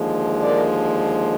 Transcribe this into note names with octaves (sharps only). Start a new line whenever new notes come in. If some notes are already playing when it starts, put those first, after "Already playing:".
Already playing: D#2 D3 F3 G#3
A#4 D5